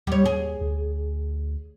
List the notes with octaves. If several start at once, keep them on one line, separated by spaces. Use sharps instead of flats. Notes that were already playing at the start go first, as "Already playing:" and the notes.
D#2 G3 C#5
G#4
D2